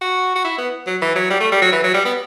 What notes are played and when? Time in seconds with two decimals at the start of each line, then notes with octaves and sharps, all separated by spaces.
0.01 F#4
0.35 F#4
0.45 E4
0.58 B3
0.87 F#3
1.02 E3
1.15 F#3
1.30 G3
1.40 A3
1.52 G3
1.62 F#3
1.72 E3
1.84 F#3
1.94 G3
2.05 B3